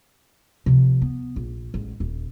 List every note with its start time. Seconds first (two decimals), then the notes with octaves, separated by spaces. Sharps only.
0.66 C3 F3
1.02 B3
1.36 A#1
1.74 A1 G#2
2.00 D#1